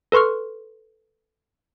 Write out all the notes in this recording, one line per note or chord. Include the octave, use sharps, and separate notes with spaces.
A4 B4 C6 C#6 F6